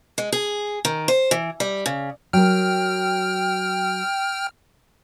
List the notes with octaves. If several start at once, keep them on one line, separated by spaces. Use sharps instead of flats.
G#3
G#4
D#3
C5
E3
G3
C#3
F#3 A#4 G5 F6